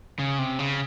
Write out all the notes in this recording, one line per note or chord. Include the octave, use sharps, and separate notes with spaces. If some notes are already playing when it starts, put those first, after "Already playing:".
C#3
C3
C#3